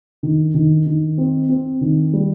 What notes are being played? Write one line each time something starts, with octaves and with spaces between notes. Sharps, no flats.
D#3
D#3
D#3
C4
C4
D#3
G3